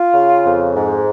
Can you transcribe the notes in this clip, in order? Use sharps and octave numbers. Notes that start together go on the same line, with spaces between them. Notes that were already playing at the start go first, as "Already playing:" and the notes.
Already playing: F4
C#3
F2
G#2